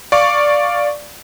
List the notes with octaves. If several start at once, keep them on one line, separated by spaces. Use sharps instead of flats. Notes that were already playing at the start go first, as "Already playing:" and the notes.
D5 F5 C#6 D6